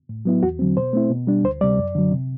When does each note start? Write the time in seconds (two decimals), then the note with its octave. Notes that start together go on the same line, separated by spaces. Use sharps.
0.09 A2
0.25 F#3 B3 E4
0.42 E2 F#4
0.59 D3 F#3 C4
0.77 B2 C5
0.93 A3 C4 E4
1.10 B2
1.27 G3 D4
1.44 D2 C5
1.61 C3 G3 D5
1.78 F#2
1.95 D3 F#3
2.12 C3